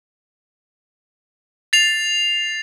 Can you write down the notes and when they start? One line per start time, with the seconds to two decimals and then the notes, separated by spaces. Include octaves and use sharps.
1.73 A6 C7 F7